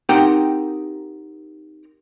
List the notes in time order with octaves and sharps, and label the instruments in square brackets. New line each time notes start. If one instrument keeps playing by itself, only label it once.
[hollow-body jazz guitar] C4 D#4 G4 A#4 F#5 G5